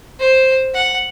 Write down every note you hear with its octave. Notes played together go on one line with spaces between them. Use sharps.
C5
F#5